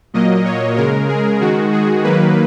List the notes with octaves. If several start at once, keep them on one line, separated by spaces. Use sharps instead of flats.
A#2 F#3 A#3 D#5
C#5
C#3 G#3 A#4
G#4
D#3 G#3 F#4
G#4
D#3 F#3 A#3 B4